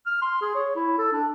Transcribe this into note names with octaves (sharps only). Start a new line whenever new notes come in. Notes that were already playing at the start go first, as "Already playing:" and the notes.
F6
C6
G#4
C#5
E4
A4
D4